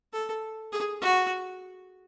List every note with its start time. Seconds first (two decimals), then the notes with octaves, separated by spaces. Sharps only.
0.13 A4
0.72 G#4
1.02 F#4